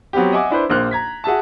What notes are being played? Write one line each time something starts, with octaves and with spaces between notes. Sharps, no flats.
F#3 B3 C4 G4
D#5 E5 F#5 G#5 D6
D4 E4 B4 C5
A#1 A#3 C5 F6 F#6
A#5 G#6 B6
F#4 G#4 E5 A5